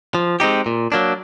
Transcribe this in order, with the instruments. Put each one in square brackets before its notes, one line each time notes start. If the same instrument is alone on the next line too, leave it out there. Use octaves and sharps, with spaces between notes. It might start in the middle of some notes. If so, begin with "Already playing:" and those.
[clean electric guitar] F3
G#3 C4 D#4 G4
A#2
F#3 A#3 D4